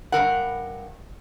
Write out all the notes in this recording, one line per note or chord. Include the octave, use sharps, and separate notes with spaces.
G2 G3 A#4 F#5